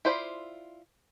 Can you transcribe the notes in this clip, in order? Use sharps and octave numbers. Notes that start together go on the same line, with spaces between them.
E4 F4 C5 D5 B5